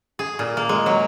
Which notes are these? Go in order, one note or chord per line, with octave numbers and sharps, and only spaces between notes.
G#4
A#2
A#3
G#3
F#3